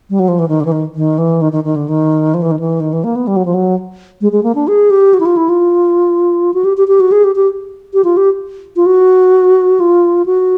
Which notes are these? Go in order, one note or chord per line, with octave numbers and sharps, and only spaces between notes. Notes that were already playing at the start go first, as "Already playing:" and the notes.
G3
F#3
F3
E3
D#3
D3
E3
D#3
D#3
E3
D#3
D#3
D#3
D3
D#3
F3
E3
D#3
E3
D#3
E3
A#3
B3
G3
F#3
F3
F#3
G#3
G#3
A#3
D4
G#4
G4
F#4
E4
F4
E4
F4
F#4
G4
G4
G4
F#4
G#4
G4
G4
G4
F4
G4
F4
F#4
F4
F#4